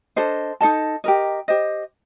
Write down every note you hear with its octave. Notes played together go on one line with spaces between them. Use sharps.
D4 A4 C5 D#5
D#4 A4 D#5 A5
G4 A#4 D#5
G4 C5 D#5